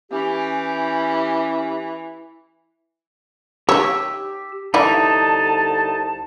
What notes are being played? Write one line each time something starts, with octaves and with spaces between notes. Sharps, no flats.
E3 C#4 G4
D#4 G4 C#5 E6
C2 D3 E3 D#4 E4 D5 A5